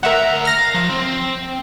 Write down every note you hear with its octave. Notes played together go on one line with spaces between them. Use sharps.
D2 A#4 E5 F#5 A#5
F6 A#6
F5
F3
C4